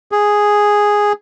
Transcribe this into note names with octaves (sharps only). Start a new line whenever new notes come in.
G#4